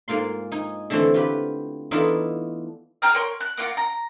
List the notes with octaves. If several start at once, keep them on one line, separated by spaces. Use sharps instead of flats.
G#2 A#3 F4 C6
D#4 G#5
D3 E3 A3 C4
F4 G4 B4
E3 A3 B3 D4 D#4 F4
G#4 G5 A#5 F6
A#4 C#5 C6
F#6
A#3 F4 F#4
A#5